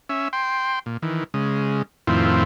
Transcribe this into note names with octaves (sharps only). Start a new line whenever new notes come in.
C#4 E5
G5 C6
A#2
D#3 E3
C#3 G#3
F2 A2 D#3 C4 E4 F4